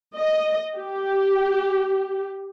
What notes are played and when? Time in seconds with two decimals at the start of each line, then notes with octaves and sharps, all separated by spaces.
0.16 D#5
0.76 G4